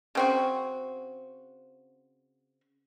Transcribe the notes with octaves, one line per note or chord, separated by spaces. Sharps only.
C#3 C4 F#4